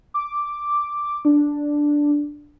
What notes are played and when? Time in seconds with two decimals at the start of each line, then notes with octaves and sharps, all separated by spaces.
0.14 D6
1.25 D4